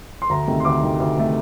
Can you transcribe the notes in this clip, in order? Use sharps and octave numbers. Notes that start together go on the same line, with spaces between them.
C6
D2 A#5
C3 D#3 A3
C6
D2 D6
C3 D#3 A3
D2
C3 D#3 A3